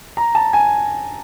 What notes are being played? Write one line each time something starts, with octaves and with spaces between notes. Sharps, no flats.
A#5
A5
G#5